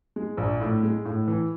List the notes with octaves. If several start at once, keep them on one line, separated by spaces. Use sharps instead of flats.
G#3
A#1
A2
G#3
A2
E3